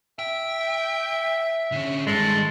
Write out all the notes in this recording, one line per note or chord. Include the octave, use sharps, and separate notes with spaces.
E5 G5
D3 C#4
G2 D#3 G#3 A4